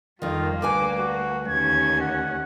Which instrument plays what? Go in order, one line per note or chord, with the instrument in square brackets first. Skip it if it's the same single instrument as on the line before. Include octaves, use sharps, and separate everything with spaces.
[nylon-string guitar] F2 D#3 [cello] G3 A#3 [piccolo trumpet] F4
[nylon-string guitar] D2 B4 G#5 [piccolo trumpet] D6
[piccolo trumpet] F#4
[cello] D#2 C#4 [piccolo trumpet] G#6
[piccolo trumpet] F#5